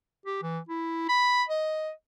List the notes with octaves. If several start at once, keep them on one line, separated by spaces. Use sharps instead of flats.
G4
E3
E4
B5
D#5